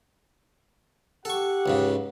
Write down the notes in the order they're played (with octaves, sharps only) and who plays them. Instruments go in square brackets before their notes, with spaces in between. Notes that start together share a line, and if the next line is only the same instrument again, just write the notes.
[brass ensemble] G4 F#5 [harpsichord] A4 C#6
[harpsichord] C#2 G#2 C#3